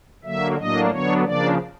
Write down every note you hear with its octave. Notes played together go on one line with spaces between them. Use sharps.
D3 F#3 A#3 E5
A2 F#3 A#3 D4 D#5
D3 F#3 B3 D4 C#5
C#3 F3 A#3 D4 D5